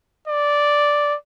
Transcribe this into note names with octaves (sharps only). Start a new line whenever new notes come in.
D5